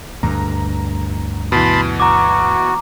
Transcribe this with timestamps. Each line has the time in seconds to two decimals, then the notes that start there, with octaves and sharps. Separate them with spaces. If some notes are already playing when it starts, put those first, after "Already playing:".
0.23 D2 G2 A#5
1.52 B2 E3 A5 B5 C6
2.00 F#4 A#5 D6